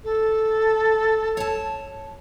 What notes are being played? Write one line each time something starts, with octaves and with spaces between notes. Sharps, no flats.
A4
C#5 A5